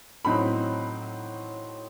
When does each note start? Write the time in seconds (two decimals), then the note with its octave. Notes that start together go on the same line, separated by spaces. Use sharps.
0.25 A2 F#3 C4 D#4 B5